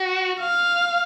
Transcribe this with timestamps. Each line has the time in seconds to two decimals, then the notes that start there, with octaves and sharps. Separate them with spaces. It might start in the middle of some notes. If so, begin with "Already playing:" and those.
Already playing: F#4
0.40 F5